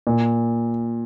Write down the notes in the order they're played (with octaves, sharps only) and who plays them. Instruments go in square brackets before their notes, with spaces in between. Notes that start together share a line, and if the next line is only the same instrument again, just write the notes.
[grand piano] A#2